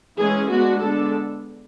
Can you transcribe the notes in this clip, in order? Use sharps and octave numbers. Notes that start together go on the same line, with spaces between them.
E3 G#3 C#4 G#4
G#3 B3 D4 F#4
D3 G#3 B3 D4 A4